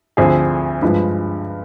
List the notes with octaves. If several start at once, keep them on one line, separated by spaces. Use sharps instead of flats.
D2 D3 F3 C4 G#4
G2 F3 G#3 B4